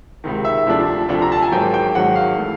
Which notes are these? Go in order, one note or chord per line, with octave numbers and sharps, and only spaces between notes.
C#2 C3 D#3
E5
D2 C3 F3 A3 D4
D2 C3 F3 A3 D4
A#5
A5
G#5
G#1 G#2 D#3 F#3 A#3 G5
G5
G#1 G#2 D#3 F#3 A#3 F#5
F5
E3 A3